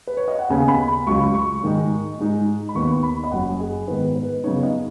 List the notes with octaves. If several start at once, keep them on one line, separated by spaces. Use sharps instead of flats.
B4
C#5
D#5
F#5
D#2 C#3 B3 G#5
B5
B5
C#2 C#3 F#3 C#6
C#6
G#2 D#3 G#3 D#4
G#2 G#3 D#4
B5
D#2 D#3 B3 D#4 C#6
B5
D#5
F#1 F#2 F#3 C#4 F#5
G#4
G#2 D#3 B3 D#4 B4
B4
F#2 C#3 B3 D#4 C#5
D#5